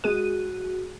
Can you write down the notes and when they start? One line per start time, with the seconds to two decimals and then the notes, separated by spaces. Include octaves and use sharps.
0.04 G#3 F#4 G#4 D#7